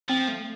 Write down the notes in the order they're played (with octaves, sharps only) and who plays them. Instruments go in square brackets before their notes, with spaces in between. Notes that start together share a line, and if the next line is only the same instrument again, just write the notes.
[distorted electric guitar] F3 [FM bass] C4
[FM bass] A3